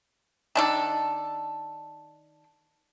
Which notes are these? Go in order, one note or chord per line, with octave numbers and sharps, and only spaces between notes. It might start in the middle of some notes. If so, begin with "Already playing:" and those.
D#3 D4 A4